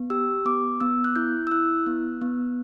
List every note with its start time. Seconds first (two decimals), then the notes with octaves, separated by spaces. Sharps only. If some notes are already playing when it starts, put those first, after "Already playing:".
Already playing: B3
0.10 G4 E6
0.45 B3 D6
0.80 B3 E6
1.04 F#6
1.16 E4 G6
1.47 E6
1.51 E4 F#6
1.86 B3
2.21 B3